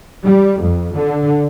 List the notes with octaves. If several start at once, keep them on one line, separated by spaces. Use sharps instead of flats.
G3
F2
D3